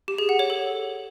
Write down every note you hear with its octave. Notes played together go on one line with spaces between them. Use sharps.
G4
G#4
F#5
C#5
A4